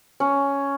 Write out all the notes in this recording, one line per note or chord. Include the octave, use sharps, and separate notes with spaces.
C#4